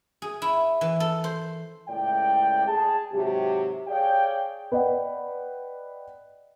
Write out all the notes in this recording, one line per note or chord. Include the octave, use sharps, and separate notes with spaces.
G#4
E4
E3
A4
C5
C#2 A2 D5 G5
G#4 A5
G#2 C3 F#3 G4
G#4 C#5 D5 F5 G5
B4 D5 D#5 F#5 G5